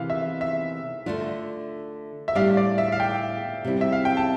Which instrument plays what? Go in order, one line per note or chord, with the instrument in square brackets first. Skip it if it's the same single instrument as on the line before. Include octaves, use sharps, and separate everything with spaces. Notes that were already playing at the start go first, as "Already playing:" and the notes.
Already playing: [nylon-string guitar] C3 E3 A#3 E4 [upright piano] F5
[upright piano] E5
E5
[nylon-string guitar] D3 A3 D4 F4
[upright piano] E5
[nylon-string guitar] A2 G3 D4 G4 [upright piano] F5
[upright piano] D5
E5
F5
G5
[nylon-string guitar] C3 G3 C4 E4
[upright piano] E5
F5
G5
A5